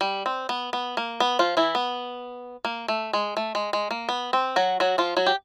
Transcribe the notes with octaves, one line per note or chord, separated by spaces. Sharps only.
G3
C4
B3
B3
A#3
B3
F3 F4
E3 E4
B3
A#3
A3
G#3
A3
G#3
G#3
A#3
B3
C4
F#3 F#4
F#3 F#4
F3 F4
F#3 F#4
G4